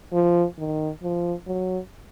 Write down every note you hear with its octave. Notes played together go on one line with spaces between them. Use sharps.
F3
D#3
F3
F#3